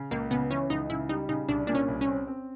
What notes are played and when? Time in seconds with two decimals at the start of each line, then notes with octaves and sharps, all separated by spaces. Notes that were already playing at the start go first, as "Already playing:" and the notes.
Already playing: C#3
0.11 C#2 A#3
0.31 C#3 B3
0.51 E3 C#4
0.70 C#2 D#4
0.90 C#3 E4
1.09 G3 D#4
1.29 C#3 D#4
1.49 C2 D4
1.67 A#2 D4
1.75 C#4
1.88 C2
2.01 C#4
2.08 C4
2.27 C4